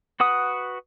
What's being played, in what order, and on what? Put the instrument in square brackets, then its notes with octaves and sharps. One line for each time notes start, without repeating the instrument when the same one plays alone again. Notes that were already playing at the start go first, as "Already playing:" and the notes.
[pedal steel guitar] F#4 B4 F#5 D#6